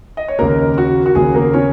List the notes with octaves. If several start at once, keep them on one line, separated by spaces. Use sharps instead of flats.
D#5
C#5
D#2 C#3 A#3 A#4
F#4
F#4
D#2 C#3 A#3 G#4
A#3 A#4
C#4 C#5